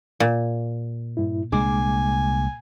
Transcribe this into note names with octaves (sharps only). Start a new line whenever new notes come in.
A#2
G2 E4
C2 G#3 A#3 D4 G#5 D6